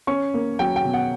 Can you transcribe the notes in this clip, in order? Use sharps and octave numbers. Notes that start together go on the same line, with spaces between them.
C#4 C#6
A#3
F#3 G5
G5
B2
F#5